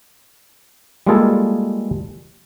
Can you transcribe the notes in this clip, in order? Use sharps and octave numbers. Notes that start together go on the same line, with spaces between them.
G3 G#3 A#3 F4 G#4 A4